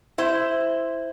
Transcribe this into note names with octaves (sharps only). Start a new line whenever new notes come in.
E4 C5